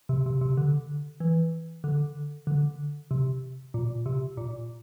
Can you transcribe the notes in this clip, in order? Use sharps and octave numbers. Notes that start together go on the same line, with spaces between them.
C3
C3
C3
D3
E3
D3
D3
C3
A#2
C3
A#2